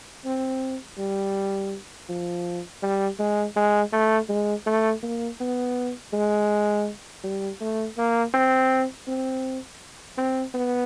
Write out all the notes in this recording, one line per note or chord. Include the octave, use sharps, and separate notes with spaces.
C4
G3
F3
G3
G#3
G#3
A3
G#3
A3
A#3
B3
G#3
G3
A3
A#3
C4
C4
C4
B3